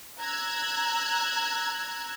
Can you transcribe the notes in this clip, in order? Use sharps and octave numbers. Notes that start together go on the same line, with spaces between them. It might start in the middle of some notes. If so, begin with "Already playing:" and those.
A#5 E6 F#6 G#6